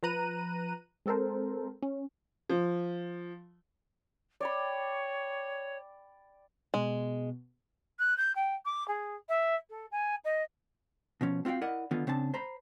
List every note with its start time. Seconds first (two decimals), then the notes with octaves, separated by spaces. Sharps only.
0.03 F3 B4 A#5 F#6 D#7
1.06 G#3 C4 A4 A#4 C5
1.83 C#4
2.49 F3
4.41 C#5 D5 G5 B5
6.74 B2 G#3
7.99 F#6
8.18 G6
8.36 G5
8.65 D6
8.88 G#4
9.29 E5
9.70 A4
9.91 G#5
10.25 D#5
11.21 B2 F3 C#4
11.45 C4 F4 F#4 F5 G5
11.61 E4 A#4 D5 D#5 F#5
11.91 D3 D#3 B3 F4
12.07 C#3 C4 D4 A5
12.34 C5 A#5 B5